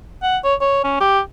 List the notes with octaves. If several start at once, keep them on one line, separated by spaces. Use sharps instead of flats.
F#5
C#5
C#5
C#4
G4